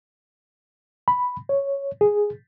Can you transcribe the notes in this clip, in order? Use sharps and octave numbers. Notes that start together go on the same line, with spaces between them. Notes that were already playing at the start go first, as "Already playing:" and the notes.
B5
C#5
G#4